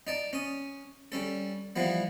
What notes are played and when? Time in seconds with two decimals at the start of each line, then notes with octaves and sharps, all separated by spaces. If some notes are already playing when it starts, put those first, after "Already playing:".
0.07 D#4 D5 A5
0.33 C#4 D#6
1.12 G3 C#4 A4
1.76 E3 F3 G3 B3